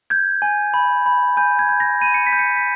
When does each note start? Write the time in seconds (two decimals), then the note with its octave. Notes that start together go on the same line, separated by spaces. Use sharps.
0.10 G6 G#6
0.42 G#5
0.74 B5
1.06 B5
1.37 G#5 G6
1.59 G#6
1.69 G6
1.80 A#6
2.01 B5 D#7
2.14 C#7
2.27 B6
2.33 G6
2.39 C#7
2.57 B6